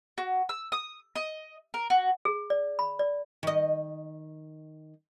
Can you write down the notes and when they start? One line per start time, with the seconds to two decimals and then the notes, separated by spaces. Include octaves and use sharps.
0.18 F#4
0.49 E6
0.72 D#6
1.15 D#5
1.74 A#4
1.90 F#4
2.25 G#4
2.50 D5
2.79 B5
2.99 D5
3.43 D#3 D#5